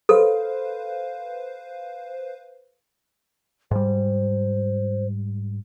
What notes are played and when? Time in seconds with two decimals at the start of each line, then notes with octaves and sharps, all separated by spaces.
0.09 A4 B4 C5 F5
3.71 G#2 G3 C5